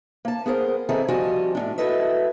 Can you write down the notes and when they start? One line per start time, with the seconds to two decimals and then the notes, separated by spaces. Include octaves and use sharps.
0.25 A#3 A5
0.46 B3 G#4 A#4 C5
0.89 D#3 E3 C4 G#4 A4
1.08 F3 G3 F#4 G4 D#5 G#5
1.55 A2 C#4 D4
1.78 E4 F#4 A4 B4 D#5 E5